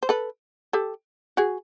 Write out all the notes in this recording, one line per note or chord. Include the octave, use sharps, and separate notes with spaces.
C5
A4 B4
G4 A4
F#4 G#4